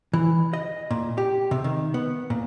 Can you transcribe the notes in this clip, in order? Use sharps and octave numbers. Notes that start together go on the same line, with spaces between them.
E3
D#5
A#2
G4
C3
D#3
B3
A#2